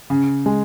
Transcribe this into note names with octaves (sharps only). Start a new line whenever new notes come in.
C#3
G#3